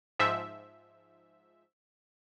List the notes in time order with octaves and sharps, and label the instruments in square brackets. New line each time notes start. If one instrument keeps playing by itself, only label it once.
[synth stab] G#2 F3 E5